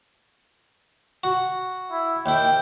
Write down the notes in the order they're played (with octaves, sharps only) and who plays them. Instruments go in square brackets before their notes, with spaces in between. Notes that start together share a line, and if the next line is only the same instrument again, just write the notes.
[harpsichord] F#4
[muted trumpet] E4
[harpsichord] D#2 E4 [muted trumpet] G5